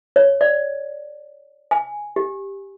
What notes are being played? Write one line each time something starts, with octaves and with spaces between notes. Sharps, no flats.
C#5
D5
G#5
G4